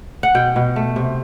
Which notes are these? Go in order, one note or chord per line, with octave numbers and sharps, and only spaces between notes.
F#5
B2 G5
B2
A3
C3